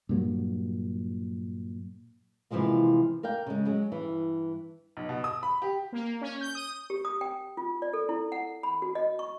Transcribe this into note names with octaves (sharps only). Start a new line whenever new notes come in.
G2 A#2 F#3
C3 E3 F3 G#3 A#3
A#4 D5 F5 G5
C#3 G#3
F#3 G#3
G2 E3
B1
B2
D#6
B5
G4
A#3
C#4
G6
D#6
G4
D#6
G5
F4
D5
A4
E4
F#5
B5
F#4
D#5
C#6